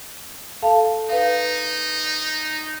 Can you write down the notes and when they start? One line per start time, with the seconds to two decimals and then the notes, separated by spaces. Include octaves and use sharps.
0.62 A4 F5 A5
1.10 D#4 B4 F5